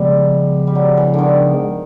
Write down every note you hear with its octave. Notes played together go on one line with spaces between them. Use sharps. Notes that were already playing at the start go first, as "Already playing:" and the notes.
Already playing: C#3 F3 G3 G#3 B3
G3
F#3
E3
D3 D#3